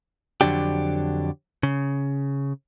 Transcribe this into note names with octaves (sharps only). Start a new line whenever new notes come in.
F2 D3 F#3 D4 G4
C#3